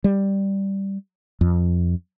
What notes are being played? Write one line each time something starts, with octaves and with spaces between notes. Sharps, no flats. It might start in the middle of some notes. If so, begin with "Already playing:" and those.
G3
F2